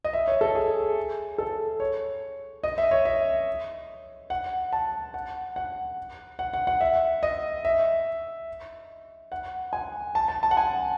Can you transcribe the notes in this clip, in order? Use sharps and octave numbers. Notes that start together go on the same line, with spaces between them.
D#5
E5
C#5
A4
G#4
A4
C#5
D#5
E5
C#5
E5
F#5
A5
F#5
F#5
F#5
F#5
F#5
E5
D#5
E5
F#5
G#5
A5
A5
A5
F#5
G#5